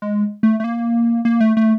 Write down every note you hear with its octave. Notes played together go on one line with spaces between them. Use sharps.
G#3
A3
A3
A#3
A#3
A3
A3